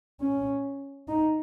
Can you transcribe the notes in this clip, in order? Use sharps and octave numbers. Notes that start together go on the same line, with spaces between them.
C#4
D#4